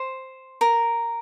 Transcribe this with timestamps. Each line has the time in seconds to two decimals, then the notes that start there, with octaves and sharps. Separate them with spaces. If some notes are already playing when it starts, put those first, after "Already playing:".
Already playing: C5
0.61 A#4